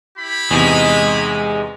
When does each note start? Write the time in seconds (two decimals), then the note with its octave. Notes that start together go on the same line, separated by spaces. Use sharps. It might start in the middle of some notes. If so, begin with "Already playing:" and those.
0.19 E4 G4 B5
0.51 E2 C3 G#3 D#4